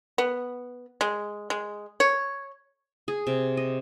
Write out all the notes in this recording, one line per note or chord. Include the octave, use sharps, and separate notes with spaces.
B3
G#3
G#3
C#5
G#4
C3
D#5